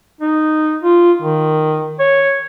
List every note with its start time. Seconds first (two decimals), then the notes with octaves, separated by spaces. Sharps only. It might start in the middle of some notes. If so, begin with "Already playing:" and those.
0.21 D#4
0.83 F4
1.22 D#3
2.00 C#5